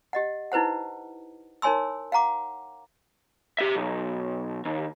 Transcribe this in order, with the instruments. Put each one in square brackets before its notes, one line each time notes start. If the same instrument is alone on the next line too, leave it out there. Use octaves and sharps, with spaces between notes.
[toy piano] G4 D#5 F#5
D#4 E4 B4 C5 F#5
D#4 A#4 C#5 G#5 C6 E6
F5 F#5 A#5 D6
[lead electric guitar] G4 E5
B1
D#2